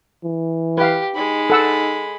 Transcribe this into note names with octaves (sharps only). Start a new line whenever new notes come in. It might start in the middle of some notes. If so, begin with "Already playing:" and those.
E3
G4 B4 F5
G#3 D#4 B5
A4 F#5 E6